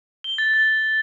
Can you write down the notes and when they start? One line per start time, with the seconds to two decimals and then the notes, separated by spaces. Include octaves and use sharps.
0.24 G7
0.38 A6
0.54 A6